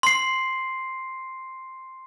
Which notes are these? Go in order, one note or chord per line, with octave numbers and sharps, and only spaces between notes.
C6 C7